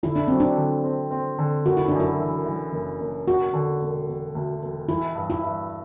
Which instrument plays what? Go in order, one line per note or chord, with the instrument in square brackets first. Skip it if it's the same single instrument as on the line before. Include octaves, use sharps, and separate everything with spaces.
[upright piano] D3 [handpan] E4
[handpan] D4
[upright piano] F#3 [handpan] C4
[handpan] D4
[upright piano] D3
C4
C4
D3
[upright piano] F#1 [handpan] F#4
[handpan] E4
[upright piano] F#2 [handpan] D4
[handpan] E4
[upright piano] E3
E3
F#1
F#1
[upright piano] E1 [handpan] F#4
[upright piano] D3
E1
E1
D2
E1
[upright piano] E3 [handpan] E4
[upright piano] G2
[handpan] E4
[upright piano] G2